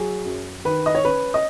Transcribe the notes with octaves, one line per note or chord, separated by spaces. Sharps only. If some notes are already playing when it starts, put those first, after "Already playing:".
Already playing: F#3 G#4
F#2
D#3 B4
D#5
C#5
C#4 B4
D#5